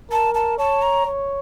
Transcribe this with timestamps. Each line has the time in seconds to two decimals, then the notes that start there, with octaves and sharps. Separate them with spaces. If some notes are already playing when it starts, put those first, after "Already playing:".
0.11 A#4 A5
0.35 A5
0.58 C#5 A5
0.82 A#5
1.06 C#5